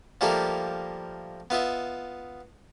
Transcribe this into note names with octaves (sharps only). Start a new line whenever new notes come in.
F3 G3 A3 A#3 G4 A#4
B3 F4 D#5 E5